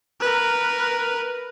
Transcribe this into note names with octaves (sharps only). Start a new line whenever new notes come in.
A#4 B4